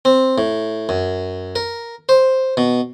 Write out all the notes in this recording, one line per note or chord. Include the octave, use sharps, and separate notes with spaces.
C4
A2
F#2
A#4
C5
B2